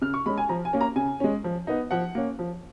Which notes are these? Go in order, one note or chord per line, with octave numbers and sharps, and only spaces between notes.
C#3 F6
C#6
G#3 C#4 B5
G#5
F3 A#5
G#5
A#3 C#4
A#5
C#3 G#5
G#3 C#4
F3
B3 D#4
F3 F#5
A#3 C#4
F3